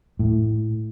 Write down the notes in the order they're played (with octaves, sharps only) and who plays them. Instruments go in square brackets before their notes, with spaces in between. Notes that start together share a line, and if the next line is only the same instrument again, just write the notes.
[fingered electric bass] A2